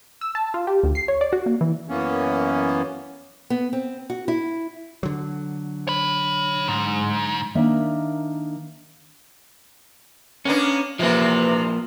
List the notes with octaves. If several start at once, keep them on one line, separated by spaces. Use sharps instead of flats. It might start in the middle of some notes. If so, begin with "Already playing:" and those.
E6
A5
F4
G4
D2
C7
C#5
D5
F#4
A#3
E3
F#2 E3 A#3 B3 C#4
B3
C4
F#4
E4
D3 F#3
C#5 B5
G#2
D#3 A#3 D4 E5
A#3 B3 C#4 D4
E2 C3 E3 F3 A#3